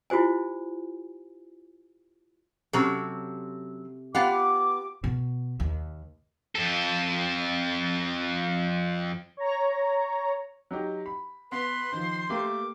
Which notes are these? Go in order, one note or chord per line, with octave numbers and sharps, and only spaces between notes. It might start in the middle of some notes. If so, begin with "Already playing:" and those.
E4 F4 G4 C5 G#5
C3 F#3 C4 C#4 A4 C#5
B3 F4 G4 B4 F5 F#5 D6
B2
D#2
F2 A4
C#5 A#5
F#3 D#4 G4
B5
B3 B4 C6
D#3 F3 C5
A3 A#3 G4 D6